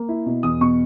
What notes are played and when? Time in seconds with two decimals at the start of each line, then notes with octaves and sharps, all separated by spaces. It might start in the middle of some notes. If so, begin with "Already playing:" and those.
Already playing: A#3
0.09 E4
0.26 B2
0.43 E2 D#6
0.61 B2 C#6